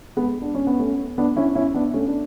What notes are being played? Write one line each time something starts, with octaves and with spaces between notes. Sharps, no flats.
G#3 B3
D4
C#4
B3
A3 C#4
B3 D4
C#4 E4
C#4 E4
B3 D4
A3 C#4
D4